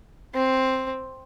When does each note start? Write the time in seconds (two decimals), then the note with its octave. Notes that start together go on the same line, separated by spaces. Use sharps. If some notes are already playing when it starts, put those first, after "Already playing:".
0.34 C4